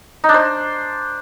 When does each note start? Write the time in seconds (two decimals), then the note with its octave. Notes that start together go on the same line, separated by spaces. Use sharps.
0.24 D#4
0.29 D4
0.34 C5